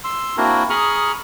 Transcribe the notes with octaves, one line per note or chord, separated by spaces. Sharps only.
C6 E6
A#3 C4 D4 E4 F#4 A#4
G#4 A#5 B5 C#6 D#6 F6